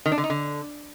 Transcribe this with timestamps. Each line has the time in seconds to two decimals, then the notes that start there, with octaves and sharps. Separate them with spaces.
0.06 D#3
0.12 D4
0.18 D3
0.24 D#4
0.30 D3